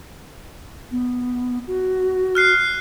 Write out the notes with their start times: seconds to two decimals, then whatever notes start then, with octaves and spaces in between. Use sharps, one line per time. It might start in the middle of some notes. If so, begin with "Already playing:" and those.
0.91 B3
1.67 F#4
2.35 F6 F#6 C7